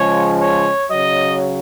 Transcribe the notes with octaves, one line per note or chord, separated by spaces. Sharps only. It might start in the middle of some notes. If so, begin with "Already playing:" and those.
Already playing: C#3 F3 G#3 C#5
C#5
C#3 F#3 D#5